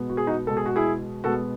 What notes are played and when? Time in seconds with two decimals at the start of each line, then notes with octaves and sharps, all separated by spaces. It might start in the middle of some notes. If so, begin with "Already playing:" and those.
Already playing: B2 G#3 B3
0.10 F#4
0.17 G#4
0.27 D#4 F#4
0.47 B2 G#3 B3 A4
0.57 G#4
0.66 F#4
0.76 E4 G#4
1.24 B2 G#3 B3 F#4 A4